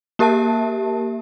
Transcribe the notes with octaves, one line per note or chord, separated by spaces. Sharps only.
A#3 G4 A#4 E5 A5